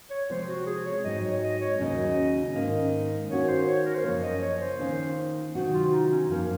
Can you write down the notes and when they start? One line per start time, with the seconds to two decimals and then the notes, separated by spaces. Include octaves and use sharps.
0.11 C#5
0.30 C3 F3 G#3 C4 C5
0.49 F#4
0.67 G#4
0.86 C#5
1.04 G#2 F#3 C4 D#4 D#5
1.24 C#5
1.42 D#5
1.61 C#5
1.79 D#2 C#3 F#3 C#4 D#5
2.55 G#2 D#3 A#3 C#4 D#5
3.30 D#3 A#3 C#4 F#4 C#5
3.48 C5
3.67 C#5
3.85 A#4
3.95 C5
4.04 F#2 C#3 F3 A#3 C#5
4.23 D#5
4.42 C#5
4.61 C5
4.79 D#3 A#3 C#4 F4
5.55 C3 D#3 F#3 C4 F#4
5.73 F4
5.92 D#4
6.10 C#4
6.29 F#2 F3 A#3 C#4